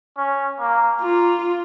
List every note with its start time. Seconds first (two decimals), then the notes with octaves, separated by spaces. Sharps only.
0.17 C#4
0.60 A#3
1.01 A#3 F4